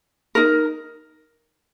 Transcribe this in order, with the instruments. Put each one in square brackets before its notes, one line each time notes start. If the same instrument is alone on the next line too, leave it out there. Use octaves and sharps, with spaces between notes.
[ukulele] D#4 A#4